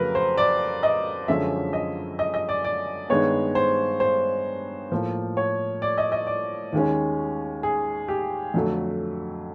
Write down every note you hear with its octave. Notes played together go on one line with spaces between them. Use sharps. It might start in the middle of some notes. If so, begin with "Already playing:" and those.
Already playing: F2 C#3 F#3 A3 A#4 B4
C5
D5
D#5
F#2 D3 F3 G#3 C#4 E5
D#5
D#5
D#5
D5
D5
G2 D#3 G#3 B3 C#5
C5
C5
A2 F3 A#3
C#5
D5
D#5
D#5
D5
D#2 D#3 G#3 C#4
G#4
G4
F2 D3 F#3 A3